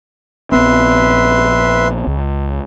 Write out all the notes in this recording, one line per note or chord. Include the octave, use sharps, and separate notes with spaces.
A#1 B3 C4 B4 E5 C6
C#2